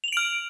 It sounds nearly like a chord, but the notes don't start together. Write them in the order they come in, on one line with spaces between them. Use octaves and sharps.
F7 F#7 D7 F6